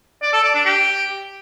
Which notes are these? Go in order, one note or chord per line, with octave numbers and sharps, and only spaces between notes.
D5
A4
D5
D4
G4